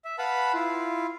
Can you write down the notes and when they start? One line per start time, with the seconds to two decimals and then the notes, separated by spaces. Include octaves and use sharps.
0.05 E5
0.18 B4 F5 F#5 A5 B5
0.54 E4 F4